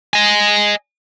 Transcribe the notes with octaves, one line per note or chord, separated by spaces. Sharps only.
D#5 G#5